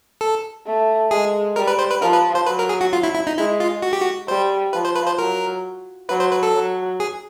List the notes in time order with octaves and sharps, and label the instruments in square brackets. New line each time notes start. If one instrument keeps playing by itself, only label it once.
[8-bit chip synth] A4
[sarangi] A3
[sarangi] G#3 [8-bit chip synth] G#4
[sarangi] G3 [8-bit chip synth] A#4
[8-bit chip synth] B4
C5
B4
[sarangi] F3 [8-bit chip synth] A#4
[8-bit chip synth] B4
C5
[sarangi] F#3 [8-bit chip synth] B4
[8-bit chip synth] A#4
G#4
F#4
F4
E4
E4
D#4
[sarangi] G#3 [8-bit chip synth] E4
[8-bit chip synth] F4
F#4
G4
F#4
[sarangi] G3 [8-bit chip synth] C5
[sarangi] F3 [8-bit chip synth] B4
[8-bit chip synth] C5
B4
C5
[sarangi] F#3 [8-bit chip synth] A#4
[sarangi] F#3 [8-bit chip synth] B4
[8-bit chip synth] C5
B4
A4
[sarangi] F#3
[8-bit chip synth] G#4